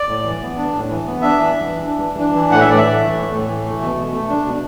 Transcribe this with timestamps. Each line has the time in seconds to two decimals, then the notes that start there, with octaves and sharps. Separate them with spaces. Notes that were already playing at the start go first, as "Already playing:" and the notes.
Already playing: D5
0.09 A2
0.25 E3
0.42 B3
0.57 D4
0.74 A2
0.90 E3
1.07 B3
1.22 D4 E5
1.39 E3
1.55 D4
1.71 E3
1.86 D4
2.03 E3
2.19 D4
2.35 E3
2.51 A2 F#5
2.61 E5
2.67 A2 D5
2.78 E5
2.84 E3
3.00 A3
3.16 A2
3.32 A2
3.48 E3
3.65 A3
3.81 B2
3.97 B2
4.13 A3
4.30 D4
4.45 B2